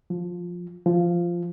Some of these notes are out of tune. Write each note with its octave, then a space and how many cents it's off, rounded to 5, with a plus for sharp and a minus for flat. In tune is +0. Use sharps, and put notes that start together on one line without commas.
F3 +10
F3 -10